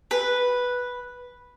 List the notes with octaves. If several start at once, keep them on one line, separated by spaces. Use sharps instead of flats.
B4